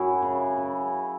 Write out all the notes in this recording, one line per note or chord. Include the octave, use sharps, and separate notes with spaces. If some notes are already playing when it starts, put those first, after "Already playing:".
Already playing: F#2 F#3 E4 F#4 G#4
C#3
C#3